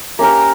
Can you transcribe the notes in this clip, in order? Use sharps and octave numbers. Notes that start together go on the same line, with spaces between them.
A#3 C#4 G4 A#4